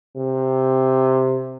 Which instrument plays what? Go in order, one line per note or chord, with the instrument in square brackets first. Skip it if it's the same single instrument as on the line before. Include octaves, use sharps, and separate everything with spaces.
[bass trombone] C3